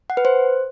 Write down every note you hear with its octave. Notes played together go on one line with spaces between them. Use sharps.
F#5
B4
C5